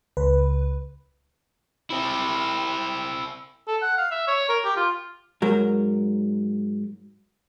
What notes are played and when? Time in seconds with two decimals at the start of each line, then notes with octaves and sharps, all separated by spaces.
0.17 C#2 B4
1.90 C4 E4
3.67 A4
3.82 F#5
3.98 F5
4.11 E5
4.28 C#5
4.49 A#4
4.65 G4
4.77 F4
5.42 G#2 F#3 A#4